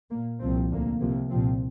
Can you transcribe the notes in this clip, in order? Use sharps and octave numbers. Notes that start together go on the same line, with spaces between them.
A#2 A#3
C2 A#2 F3 C4
D2 D3 A#3
C2 C3 F3 A#3
C2 A#2 F3 C4